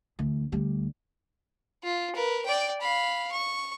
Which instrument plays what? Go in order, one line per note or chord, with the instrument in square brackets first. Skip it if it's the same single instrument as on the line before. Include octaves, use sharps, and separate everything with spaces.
[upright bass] D2 E3
D2 G3
[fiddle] F4
A#4 B4
D5 G5
F5 B5
C#6